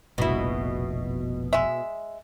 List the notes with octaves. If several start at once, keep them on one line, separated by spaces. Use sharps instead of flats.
F1 A#1 B2 E4
G#3 E5